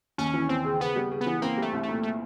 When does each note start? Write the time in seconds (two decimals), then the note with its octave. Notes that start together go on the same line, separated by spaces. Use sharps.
0.18 D#2 C#4
0.34 E3
0.49 D#2 C4
0.65 C#3
0.80 C#3 B3
0.96 G3
1.12 C#3
1.21 B3
1.26 E3
1.42 A#3 C4
1.58 G3 A3
1.73 C2
1.83 A3
1.89 A#2
2.03 A3